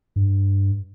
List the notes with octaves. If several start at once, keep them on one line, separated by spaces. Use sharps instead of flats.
G2